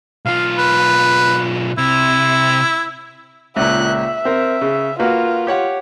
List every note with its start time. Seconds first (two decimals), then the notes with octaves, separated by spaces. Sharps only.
0.25 B1 F4 F5
0.58 B4
1.78 C3 E4
3.56 C#2 A#2 E5 F#6
3.88 E5
4.25 C4 A#4
4.61 C#3
4.99 A#3 F4 F#4 B4
5.47 G4 C#5 F#5